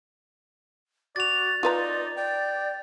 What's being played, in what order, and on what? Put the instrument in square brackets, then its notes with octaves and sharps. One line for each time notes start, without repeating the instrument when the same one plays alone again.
[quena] F#4 [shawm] D5 [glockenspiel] A6 F7
[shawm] D#4 [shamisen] F4 B4 A#5 [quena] D5
[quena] D5 [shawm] G5